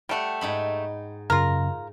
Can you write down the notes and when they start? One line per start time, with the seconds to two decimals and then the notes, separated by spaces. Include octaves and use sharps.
0.09 G3 A3 F#5 G5
0.41 G#2 D#4 B5
1.30 F#2 C#3 F4 A#4